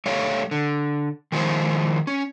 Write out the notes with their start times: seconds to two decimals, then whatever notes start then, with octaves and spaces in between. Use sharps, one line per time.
0.06 G3 A3 C#5 F5
0.51 D3
1.32 D#3 F3 G#3 E4 C5
2.07 C#4